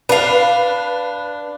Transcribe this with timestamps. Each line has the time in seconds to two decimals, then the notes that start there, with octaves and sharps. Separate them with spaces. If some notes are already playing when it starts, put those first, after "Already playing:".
0.09 D4 B4 F5